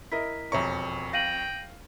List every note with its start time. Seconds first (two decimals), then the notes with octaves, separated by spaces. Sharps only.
0.12 E4 A#4 D#5 B6
0.52 E1 F2 C#5 A#5 C#6
1.13 F5 G5 A#6 D#7 F#7